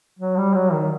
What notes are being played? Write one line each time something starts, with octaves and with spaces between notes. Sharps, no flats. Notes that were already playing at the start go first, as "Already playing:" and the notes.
F#3
G3
F#3
D#3